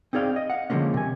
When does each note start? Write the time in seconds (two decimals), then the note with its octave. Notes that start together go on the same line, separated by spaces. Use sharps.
0.13 C4 D#4 G#4 D5 F5 G5
0.36 D#5
0.50 F5 F#5
0.70 D3 F3 G#3 A#3 C#4
0.94 C3 G#5